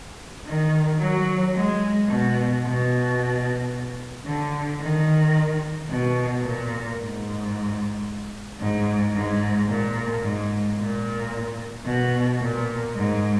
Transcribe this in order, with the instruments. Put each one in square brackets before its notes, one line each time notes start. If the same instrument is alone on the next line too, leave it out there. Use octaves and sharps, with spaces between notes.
[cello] D#3
F#3
G#3
B2
B2
D3
D#3
B2
A#2
G#2
G#2
G#2
A#2
G#2
A#2
B2
A#2
G#2